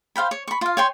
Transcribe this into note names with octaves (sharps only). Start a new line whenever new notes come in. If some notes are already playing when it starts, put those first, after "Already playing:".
C5 F5 G5 B5
C#5
B5 C#6
F4 F5
C#5 G5 C6